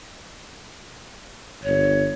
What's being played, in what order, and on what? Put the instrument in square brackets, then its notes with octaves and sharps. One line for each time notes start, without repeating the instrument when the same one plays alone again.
[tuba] G1 [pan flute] C#5